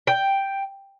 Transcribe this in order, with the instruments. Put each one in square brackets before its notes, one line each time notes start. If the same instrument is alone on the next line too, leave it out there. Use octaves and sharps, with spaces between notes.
[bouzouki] G5